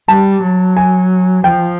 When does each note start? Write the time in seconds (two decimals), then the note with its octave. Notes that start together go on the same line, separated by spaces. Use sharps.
0.08 G3 A5
0.43 F#3
0.77 G#5
1.44 F3 G5